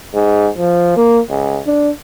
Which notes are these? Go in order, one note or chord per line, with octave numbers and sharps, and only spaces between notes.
G#2
F3
A#3
C#2
D4